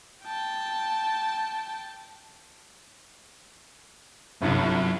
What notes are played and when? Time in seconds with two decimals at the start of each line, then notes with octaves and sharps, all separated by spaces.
0.23 G5 A5
4.42 G1 C2 F#2